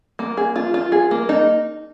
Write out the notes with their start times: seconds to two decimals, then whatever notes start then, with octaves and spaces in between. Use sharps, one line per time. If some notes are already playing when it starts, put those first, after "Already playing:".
0.19 A#3
0.37 G#4
0.56 F4
0.74 F4
0.92 G#4
1.11 A#3
1.29 D#4